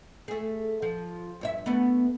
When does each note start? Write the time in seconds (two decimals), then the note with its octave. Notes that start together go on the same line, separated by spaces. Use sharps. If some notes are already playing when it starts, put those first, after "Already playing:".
0.28 A3 G#4
0.82 F3
1.41 G2 C#5 E5
1.66 A3 B3